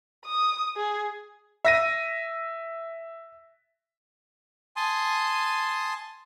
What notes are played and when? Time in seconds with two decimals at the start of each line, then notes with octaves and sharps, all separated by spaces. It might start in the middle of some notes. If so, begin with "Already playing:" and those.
0.25 D#6
0.76 G#4
1.65 E5 A#6 D#7
4.76 G#5 A5 C6 D#6